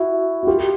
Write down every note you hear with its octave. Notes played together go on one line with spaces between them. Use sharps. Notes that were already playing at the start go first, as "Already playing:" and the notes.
Already playing: E4 F#4
F#4
F4 G4